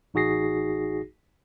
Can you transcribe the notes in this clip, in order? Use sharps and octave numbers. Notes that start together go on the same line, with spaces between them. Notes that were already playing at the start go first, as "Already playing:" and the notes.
A1 D#4 F#4 G#4 A#6 C7